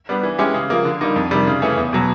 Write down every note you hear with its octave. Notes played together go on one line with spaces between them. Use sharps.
G3 B3 D4
E3
G#3 C#4 E4 G4
C#3
F3 A#3
D3
G3 A#3 D#4
F2
C3 D#3 G3
C#3
E3 A3 C#4
E2
B2 F#3